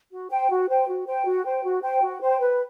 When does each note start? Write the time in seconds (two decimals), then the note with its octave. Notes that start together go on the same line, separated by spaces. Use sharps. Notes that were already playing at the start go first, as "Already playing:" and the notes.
0.11 F#4
0.30 C5 G5
0.50 F#4
0.69 C5 G5
0.88 F#4
1.07 C5 G5
1.25 F#4
1.45 C5 G5
1.64 F#4
1.83 C5 G5
2.03 F#4
2.21 C5 G5
2.40 B4